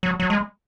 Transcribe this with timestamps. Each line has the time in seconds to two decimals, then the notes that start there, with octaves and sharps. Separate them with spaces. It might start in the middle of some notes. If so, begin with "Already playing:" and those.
0.03 F#3
0.20 F#3
0.30 G#3